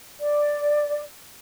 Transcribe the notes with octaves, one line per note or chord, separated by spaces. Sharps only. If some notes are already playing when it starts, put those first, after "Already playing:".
D5